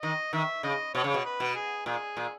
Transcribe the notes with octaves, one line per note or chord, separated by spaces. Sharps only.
D#3 D#5
D#3 E5
C#3 D#5
B2 C#5
C#3
B2
B4
B2
G#4
A#2 G#4
A#2